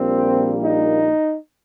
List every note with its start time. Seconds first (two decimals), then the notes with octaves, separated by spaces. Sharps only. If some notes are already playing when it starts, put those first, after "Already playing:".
Already playing: A#1 A#2 G3 A#3 C4
0.62 D#4